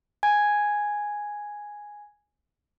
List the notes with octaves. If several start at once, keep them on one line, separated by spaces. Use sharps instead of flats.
G#5 G#6